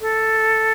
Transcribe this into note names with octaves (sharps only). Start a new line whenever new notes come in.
A4